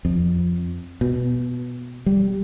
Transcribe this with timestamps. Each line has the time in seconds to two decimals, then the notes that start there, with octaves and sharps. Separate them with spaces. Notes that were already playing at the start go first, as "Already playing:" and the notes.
0.05 F2
1.01 B2
2.06 G3